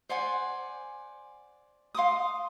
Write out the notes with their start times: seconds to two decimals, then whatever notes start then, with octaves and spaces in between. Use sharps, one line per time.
0.09 C5 D5 F#5 G#5
1.95 F5 C6 D6 D#6